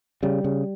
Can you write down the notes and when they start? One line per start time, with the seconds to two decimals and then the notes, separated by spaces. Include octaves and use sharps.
0.23 C#3 G3
0.44 C#3